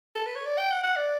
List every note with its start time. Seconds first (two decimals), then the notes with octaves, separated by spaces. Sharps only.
0.15 A4
0.26 B4
0.35 C#5
0.45 D5
0.58 G5
0.72 F#5
0.83 F#5
0.96 D5